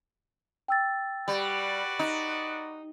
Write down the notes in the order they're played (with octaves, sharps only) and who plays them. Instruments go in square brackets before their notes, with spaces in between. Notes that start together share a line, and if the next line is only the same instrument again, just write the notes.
[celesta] G5 E6 A6
[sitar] G3 [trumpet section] F#4 B4 D5
[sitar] D#4